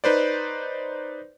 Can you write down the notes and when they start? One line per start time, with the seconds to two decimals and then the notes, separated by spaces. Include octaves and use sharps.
0.04 D#4 B4 C5 D5